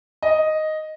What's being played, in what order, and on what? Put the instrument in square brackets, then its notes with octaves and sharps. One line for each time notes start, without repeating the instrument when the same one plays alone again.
[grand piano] D#5